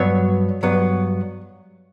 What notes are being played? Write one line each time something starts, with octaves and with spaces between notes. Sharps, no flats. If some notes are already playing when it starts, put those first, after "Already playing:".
Already playing: G2 F#3 B3 C#5
G2 F#3 B3